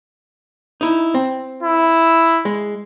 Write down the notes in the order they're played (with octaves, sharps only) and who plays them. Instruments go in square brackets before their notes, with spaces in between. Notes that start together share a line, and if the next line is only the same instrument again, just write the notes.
[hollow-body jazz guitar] D#4 E4
C4
[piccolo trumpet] E4
[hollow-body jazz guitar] G#3